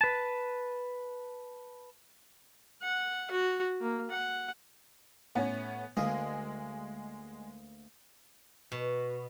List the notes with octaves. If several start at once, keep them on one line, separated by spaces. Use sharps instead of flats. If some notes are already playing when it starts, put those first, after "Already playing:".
B4 A5
F#5
F#4
A#3
F#5
A2 B3 C#4
D2 G#3 A#3 D#5
B2